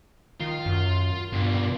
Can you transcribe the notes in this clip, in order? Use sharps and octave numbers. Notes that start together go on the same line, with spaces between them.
D#3 F4
F#2
G2 B2 F4